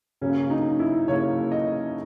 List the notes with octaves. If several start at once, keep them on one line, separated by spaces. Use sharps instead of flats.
C#3 F#3 A#3 C#4
D#4
E4
C#3 F#3 A#3 C#5
D#5